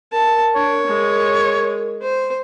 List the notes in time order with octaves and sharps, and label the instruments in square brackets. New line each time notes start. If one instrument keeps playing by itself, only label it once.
[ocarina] A#4 [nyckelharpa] A5
[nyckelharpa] D4 [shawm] C#5
[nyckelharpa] G#3
C5